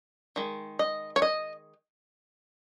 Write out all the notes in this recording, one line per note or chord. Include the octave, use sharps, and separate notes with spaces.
D#3 G#3
D#5
C#5
D#5